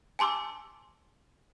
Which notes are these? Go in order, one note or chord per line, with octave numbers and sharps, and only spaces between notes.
G#5 A5 C6 D6 E6